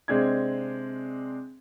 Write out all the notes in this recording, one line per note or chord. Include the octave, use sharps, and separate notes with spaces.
C3 G#3 C4 D4 G#6